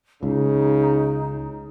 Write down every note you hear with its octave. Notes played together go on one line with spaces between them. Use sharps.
C#2 C#3 D#4